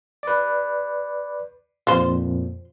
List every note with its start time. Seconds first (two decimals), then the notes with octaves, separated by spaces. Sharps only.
0.23 B4 D5
1.87 F2 A#2 F3 C5